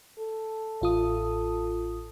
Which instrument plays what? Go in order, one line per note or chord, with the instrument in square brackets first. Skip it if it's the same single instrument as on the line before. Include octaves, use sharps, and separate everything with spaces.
[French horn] A4
[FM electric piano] A1 F4 D#6